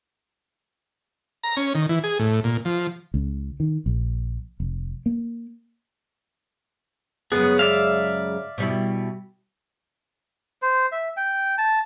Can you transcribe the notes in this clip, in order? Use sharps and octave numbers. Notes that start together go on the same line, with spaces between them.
A#5
C#4
D#3
E3
G#4
A2
A#2
F3
C#2
D#3
A#1
F1
A#3
F#2 C#3 G#3 B3 G#4
D5 E5 F5
B2 G3 E4
C5
E5
G5
A5